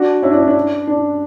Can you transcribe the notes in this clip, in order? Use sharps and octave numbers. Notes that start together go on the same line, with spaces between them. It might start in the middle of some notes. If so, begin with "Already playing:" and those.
Already playing: D4 F#4
C#4 E4
D4
C#4
D4
D4